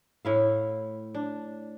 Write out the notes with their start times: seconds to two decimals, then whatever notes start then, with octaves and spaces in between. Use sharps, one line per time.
0.25 A2 E4 F5
1.15 D4